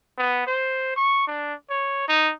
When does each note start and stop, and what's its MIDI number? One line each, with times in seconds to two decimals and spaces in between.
0.18 0.44 59
0.47 0.92 72
0.96 1.25 85
1.27 1.54 62
1.70 2.06 73
2.08 2.32 63